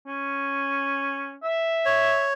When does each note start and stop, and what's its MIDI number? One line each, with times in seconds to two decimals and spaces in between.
0.07 1.35 61
1.43 2.29 76
1.85 2.33 73